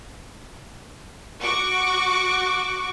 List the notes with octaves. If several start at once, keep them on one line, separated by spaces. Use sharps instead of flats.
F#4 C#6 D6